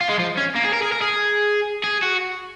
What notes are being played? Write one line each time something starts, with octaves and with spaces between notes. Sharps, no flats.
F4
G#3
F3
C#4
A#3
G#4
A#4
G#4
A#4
G#4
G#4
F#4